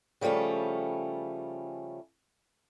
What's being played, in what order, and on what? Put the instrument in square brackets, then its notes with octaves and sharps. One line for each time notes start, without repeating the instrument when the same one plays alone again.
[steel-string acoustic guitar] C#3 F3 G3 A3 C#4